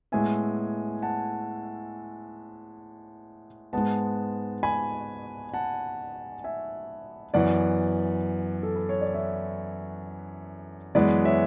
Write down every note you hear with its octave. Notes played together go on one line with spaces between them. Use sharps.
A2 G#3 B3 E5 G#5
F#5 A5
G#2 G#3 B3 F#5 A5
G#5 B5
F#5 A5
E5 G#5
F#2 E3 B3 D5 F#5
A4
B4
C#5
D5
C#5 E5
F#2 E3 G#3 B3 B4 D5
C#5 E5